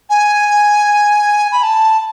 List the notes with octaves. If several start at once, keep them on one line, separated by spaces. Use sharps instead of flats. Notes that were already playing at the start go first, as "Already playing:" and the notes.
G#5
B5
A5